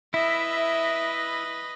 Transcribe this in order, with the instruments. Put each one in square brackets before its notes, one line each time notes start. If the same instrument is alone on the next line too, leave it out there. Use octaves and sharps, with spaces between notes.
[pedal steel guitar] E4 [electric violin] B4 D#5 [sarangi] E5